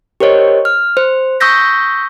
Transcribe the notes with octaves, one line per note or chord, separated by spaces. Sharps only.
G4 A#4 C5 C#5 D#5
F6
C5
C#6 D#6 E6 G6 A#6 B6